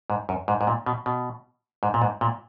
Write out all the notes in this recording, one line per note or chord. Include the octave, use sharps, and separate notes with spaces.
G#2
F#2
G#2
G#2
A#2
B2
B2
G#2
A#2
G#2
A#2